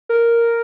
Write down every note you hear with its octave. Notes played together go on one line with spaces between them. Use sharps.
A#4